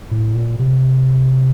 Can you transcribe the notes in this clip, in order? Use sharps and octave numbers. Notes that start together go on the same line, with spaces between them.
A2
A#2
C3